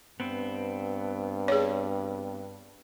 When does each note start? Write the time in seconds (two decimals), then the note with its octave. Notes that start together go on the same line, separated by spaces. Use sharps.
0.20 G2 B3 C4
1.48 G#4 C#5